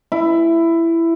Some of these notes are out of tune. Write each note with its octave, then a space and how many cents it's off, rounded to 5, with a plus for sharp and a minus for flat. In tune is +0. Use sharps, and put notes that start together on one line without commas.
E4 +10